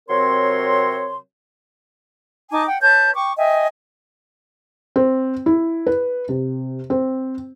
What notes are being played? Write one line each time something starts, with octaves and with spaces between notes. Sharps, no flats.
C3 F#3 C4 A#4 C#5 C6
D#4 G#5 A5 D6
F#5 G5
B4 C#5 A5 G6
G5 C#6 D6
D#5 E5 G5 G#5
C4
E4
B4
C3
C4